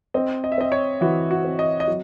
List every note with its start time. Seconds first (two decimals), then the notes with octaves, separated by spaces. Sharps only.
0.14 C4 D#5
0.44 D#5
0.52 E5
0.58 C4 D#5
0.72 C#5
1.01 E3 F#4
1.31 F#4
1.44 C4
1.59 D#5
1.80 D#5
1.88 F#3